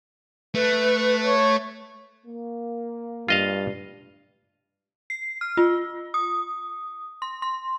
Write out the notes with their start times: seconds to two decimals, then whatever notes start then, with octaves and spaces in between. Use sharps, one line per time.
0.55 A3 B4
1.26 C#5
2.27 A#3
3.28 G2 F4 D#5 F5
5.10 C7
5.41 F6
5.57 F4
6.14 D#6
7.22 C6
7.42 C6